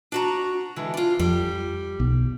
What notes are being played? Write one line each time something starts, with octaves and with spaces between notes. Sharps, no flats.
D4 F#4 A#5
D3 E3 G#3
D4 F4
F2 G3
B1